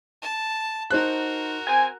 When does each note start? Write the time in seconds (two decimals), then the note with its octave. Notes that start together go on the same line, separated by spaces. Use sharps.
0.22 A5
0.91 D#4 F#4 A#4 C5 F#6
1.67 C4 G#5